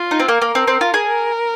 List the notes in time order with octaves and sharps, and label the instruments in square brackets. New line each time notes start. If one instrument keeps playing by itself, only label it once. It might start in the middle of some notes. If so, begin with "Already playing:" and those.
Already playing: [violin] F4
[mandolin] D#4
C4
[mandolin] A#3 [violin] A#4
[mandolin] A#3
C4
C4
F4
G#4
[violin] A#4